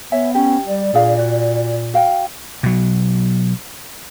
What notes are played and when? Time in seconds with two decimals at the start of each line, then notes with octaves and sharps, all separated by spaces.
0.12 B3 C#5 E5 G#5
0.35 C#4 G4
0.67 G3 D5
0.94 A#2 D4 G#4 F5
1.19 F#4
1.94 F#4 F5 G5
2.63 B2 F#3